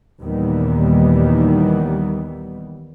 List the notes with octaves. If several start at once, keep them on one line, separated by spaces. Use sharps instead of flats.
D#2 A#2 D#3 E3 G3 B3